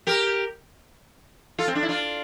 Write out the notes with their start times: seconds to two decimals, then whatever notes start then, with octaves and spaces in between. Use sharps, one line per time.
0.07 G4 A#4
1.58 F4 A4
1.68 C4
1.75 D4
1.83 E4
1.89 D4 F4